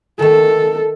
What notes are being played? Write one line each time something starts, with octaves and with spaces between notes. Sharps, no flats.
D#3 A3 A4